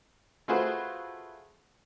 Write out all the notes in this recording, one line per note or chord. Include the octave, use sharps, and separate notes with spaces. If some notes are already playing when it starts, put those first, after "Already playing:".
A3 F4 F#4 G#4 B4 C5